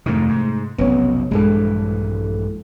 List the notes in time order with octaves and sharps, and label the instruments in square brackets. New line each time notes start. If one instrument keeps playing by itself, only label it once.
[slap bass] F2 G#2 D#3 [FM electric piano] C3 A3
[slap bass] G#2
[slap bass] F1 B1 [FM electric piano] B3 C#4 C#5
[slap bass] A#1 G2 E3 [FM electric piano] G#3 A4